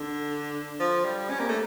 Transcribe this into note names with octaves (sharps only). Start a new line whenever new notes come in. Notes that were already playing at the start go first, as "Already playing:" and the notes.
Already playing: D3
F3
G3
C#4
A#3
A3